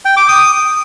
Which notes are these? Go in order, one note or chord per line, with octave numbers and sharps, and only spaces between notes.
G5
D6
D#6